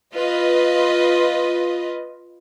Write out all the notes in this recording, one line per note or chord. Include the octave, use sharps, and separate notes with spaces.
F4 B4 D#5